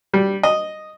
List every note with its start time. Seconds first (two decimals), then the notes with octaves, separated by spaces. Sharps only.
0.13 G3
0.43 D#5